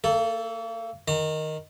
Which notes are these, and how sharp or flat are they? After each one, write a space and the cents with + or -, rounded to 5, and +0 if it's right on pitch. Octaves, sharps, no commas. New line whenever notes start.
A#3 -35 A4 +0
D#3 +0 A#5 -45